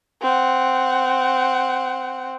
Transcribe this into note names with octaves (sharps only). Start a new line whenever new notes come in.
C4 F#5